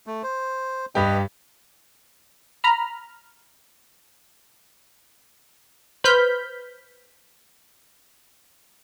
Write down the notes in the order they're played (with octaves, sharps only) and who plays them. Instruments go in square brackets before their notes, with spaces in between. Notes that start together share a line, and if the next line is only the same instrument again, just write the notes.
[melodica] A3
C5
[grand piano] G2 G4 [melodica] B4 D#5
[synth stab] A#5 B5 F6
B4 C5 B5 F6 G6 B6